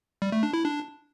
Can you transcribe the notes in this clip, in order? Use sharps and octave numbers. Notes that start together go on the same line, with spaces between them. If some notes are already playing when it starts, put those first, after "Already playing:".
G3
A3
D4
E4
D4